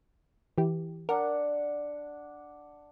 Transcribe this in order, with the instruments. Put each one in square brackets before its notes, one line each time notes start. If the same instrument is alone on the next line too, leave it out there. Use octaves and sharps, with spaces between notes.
[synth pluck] E3 G4
[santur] D4 F#5 [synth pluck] A#4